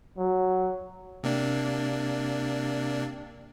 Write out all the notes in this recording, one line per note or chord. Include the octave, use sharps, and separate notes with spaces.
F#3
C3 A#3 D4